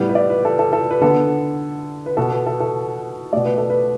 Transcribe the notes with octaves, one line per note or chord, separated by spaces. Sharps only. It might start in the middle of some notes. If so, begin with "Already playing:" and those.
Already playing: A2 G3 B3
B4
D5
B4
A4
A4
A4
B4
D3 B3 A4
B4
B2 B3 A4
B4
A4
A4
B2 A3 D5
B4
A4
B4